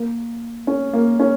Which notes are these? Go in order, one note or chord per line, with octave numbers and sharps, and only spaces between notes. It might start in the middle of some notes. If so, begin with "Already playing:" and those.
Already playing: A#3
C#4
A#3
C#4